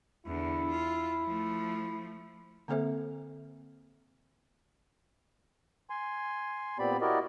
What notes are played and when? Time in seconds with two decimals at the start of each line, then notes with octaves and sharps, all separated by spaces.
0.27 E2 D3 E4
0.71 F4
1.24 F3 A3
2.68 D3 A#3 C4 A4 C5 E5
5.90 G#5 C6
6.79 A#2 B3 C4 G4 D5 B5
7.01 E4 F#4 G4 A#4 D5 D#5